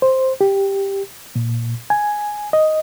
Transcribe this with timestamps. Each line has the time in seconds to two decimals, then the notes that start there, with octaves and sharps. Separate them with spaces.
0.02 C5
0.41 G4
1.35 A#2
1.90 G#5
2.53 D#5